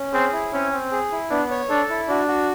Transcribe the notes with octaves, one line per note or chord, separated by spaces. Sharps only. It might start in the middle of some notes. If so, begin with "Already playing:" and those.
Already playing: C#4
C4 G#4
E4
C4 C#4
C4
G#4
E4
B3 D4
C#5
D4 A4
E4
D4 F#4
F#4